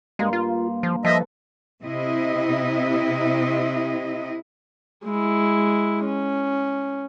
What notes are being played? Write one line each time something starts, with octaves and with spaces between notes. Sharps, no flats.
G2 G#3 A#3 C6
F4
F3
F3 A4 B4 D#5 E5
C3 E4 D#5
G#3 E4
C#4